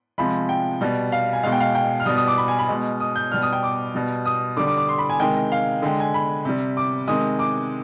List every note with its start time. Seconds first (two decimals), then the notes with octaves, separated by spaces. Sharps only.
0.18 C3 F3 G#3 B5
0.49 G5
0.81 B2 G3
1.12 F5
1.33 G#5
1.43 B2 G#3 F5
1.52 G5
1.60 F5
1.75 G5
2.00 F6
2.05 B2 G3 D#6
2.16 D#6
2.28 D6
2.38 B5
2.48 G#5
2.59 B5
2.68 B2 G#3
3.00 D#6
3.16 G6
3.32 B2 G3 F6
3.42 D#6
3.53 G5
3.63 D6
3.95 B2 G3
4.26 D#6
4.57 D3 G3 D6
4.67 D6
4.78 D6
4.89 C6
4.98 B5
5.10 G#5
5.20 C3 D#3 G#3 G5
5.52 F5
5.82 D3 G#3 G5
6.00 G#5
6.14 B5
6.45 C3 G3
6.77 D6
7.08 C3 D#3 G#3 D#6
7.39 D6